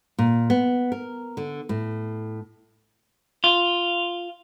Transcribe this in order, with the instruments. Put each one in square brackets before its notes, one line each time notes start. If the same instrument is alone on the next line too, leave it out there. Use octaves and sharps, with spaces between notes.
[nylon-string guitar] A#2
B3
A#4
D3
A2
[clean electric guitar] F4